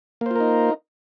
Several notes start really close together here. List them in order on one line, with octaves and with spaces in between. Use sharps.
A#3 C5 F4 A#4 D#4